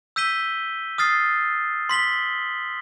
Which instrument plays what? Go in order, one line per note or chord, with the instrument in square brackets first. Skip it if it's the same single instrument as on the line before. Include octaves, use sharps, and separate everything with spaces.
[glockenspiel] E6 G6 B6 D#7 G7
D#6 F6 A6 C7
C6 B6 F#7 G7